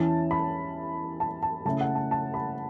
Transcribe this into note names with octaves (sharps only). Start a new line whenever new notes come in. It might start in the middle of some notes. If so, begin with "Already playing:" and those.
Already playing: E2 E3 C#4 E4 A5
B5
A5
A5
C#3 A3 C#4 E4 A5
F#5
A5
A5
B5